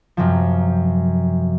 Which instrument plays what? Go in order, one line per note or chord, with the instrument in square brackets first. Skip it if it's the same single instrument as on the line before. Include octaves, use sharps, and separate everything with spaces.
[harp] F#2 C3 F3